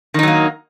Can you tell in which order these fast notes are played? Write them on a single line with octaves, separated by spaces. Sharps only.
D#3 D#4 F#3 A#3